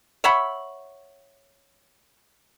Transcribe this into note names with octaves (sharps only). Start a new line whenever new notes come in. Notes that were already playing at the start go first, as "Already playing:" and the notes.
C#5 E5 F#5 B5